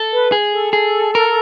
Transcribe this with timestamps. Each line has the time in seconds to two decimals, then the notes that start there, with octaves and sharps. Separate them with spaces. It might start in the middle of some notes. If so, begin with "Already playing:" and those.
Already playing: A4
0.12 B4
0.32 G#4
0.53 A4
0.73 G#4
1.15 A#4